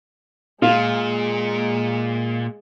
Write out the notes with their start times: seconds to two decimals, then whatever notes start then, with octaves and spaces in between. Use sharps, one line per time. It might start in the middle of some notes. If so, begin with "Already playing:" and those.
0.62 A#2 G#3 F4